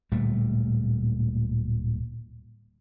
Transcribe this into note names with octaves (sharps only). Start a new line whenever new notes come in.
D1 A#2 G3 A3